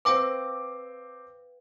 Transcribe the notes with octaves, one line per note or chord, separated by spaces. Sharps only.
C4 B4 F5 G5 D6